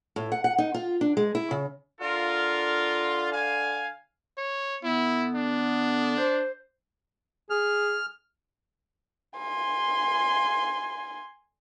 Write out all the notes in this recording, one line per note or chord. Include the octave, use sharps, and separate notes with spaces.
A2
F#5
F#5
D#4
F4
D4
G#3
E4
C#3
D3 F4 A#4
F5 G#5
C#5
D3 B3 E4
D4
C5
G#4 F6
G#5 C6